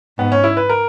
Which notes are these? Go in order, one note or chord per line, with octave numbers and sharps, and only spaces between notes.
G#2 B3
C#4
E4
B4
A#4